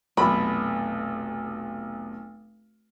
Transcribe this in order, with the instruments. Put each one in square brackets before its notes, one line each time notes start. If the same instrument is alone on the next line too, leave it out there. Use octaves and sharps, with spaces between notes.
[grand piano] F1 B1 [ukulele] B5